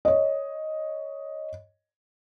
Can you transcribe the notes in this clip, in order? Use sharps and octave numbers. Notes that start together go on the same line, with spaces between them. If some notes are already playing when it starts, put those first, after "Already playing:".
C#5 D#5